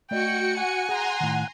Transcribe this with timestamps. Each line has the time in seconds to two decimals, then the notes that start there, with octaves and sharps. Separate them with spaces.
0.11 A3 F#4 D5 D#5 G5 C#7
0.57 F#5 G#5
0.89 G#4 A#5 C6
1.20 A2 D#3